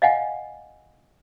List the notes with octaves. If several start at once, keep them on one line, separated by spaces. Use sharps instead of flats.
D#5 F5 F#5 G#5